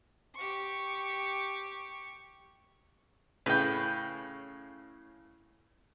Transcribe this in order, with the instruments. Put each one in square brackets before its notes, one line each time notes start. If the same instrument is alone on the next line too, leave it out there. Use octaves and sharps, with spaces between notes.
[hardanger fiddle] G4 C#6
[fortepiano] A2 C#3 [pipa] B4 G5